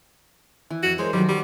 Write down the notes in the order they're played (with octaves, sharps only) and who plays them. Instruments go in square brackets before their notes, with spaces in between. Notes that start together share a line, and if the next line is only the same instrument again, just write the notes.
[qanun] E3
[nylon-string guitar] F2 [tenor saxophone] F#4
[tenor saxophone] G#3 [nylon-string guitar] A#4 C#5 [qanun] C5
[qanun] D#3 F#4 [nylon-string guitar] F#3 A4 [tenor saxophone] G3
[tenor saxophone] G3 [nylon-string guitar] G#4